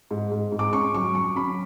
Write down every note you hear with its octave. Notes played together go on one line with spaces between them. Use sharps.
G#2
G#2
G#2
D6
C#4 C#6
F#3 C#6
F#3 C#6
C#4 B5